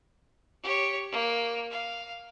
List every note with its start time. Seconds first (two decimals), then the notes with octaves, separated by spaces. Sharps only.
0.63 G4 C#5
1.10 A#3
1.71 F5